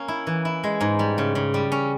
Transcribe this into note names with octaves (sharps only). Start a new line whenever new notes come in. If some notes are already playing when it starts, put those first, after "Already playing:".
Already playing: A#3 C#4
E4
E3
E4
G#3
G#2
G3
C#3
C#3
G3
C#4